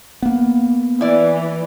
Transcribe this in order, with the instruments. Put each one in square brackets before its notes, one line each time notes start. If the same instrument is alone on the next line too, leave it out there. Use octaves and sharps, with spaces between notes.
[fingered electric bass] A#3 B3
[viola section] E3 [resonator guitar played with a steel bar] E4 D5